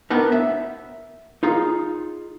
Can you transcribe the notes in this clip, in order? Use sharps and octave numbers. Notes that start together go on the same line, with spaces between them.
B3 D4 D#4 A#4 B4
E5
D#4 F4 G#4